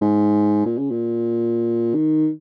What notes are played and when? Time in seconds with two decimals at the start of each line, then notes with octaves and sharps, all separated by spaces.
0.01 G#2
0.65 A#2
0.78 C#3
0.91 A#2
1.94 D#3